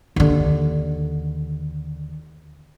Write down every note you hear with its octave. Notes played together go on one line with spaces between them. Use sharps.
D#2 D3